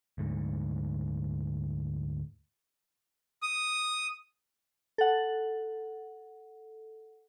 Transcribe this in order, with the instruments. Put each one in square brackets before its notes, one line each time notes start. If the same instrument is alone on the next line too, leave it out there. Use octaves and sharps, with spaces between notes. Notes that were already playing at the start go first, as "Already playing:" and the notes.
[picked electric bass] D2 G#2
[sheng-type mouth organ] D#6
[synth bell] A4 F#5